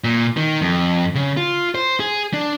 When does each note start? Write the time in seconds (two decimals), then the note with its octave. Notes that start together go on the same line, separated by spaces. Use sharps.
0.04 A#2
0.37 D#3
0.62 F2
1.15 C#3
1.37 F4
1.75 C5
2.00 G#4
2.33 D4